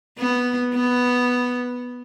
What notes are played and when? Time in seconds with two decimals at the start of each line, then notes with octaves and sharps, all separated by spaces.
0.18 B3
0.74 B3